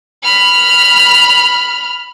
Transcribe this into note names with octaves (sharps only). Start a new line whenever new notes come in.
B5 F6